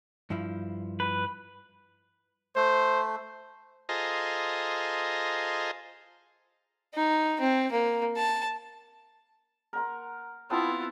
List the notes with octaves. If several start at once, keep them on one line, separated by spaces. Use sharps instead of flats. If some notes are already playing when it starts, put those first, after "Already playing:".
G2 F3 E4
B4
A3 C5
F4 G#4 A4 C5 D#5 A#5
D#4
C4
A#3
A5
A#4 F#5 C6
B3 C4 E4 F4 A4